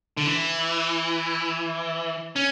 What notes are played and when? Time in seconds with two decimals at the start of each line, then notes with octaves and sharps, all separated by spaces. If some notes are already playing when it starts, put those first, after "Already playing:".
0.17 D3
0.26 E3
2.36 C#4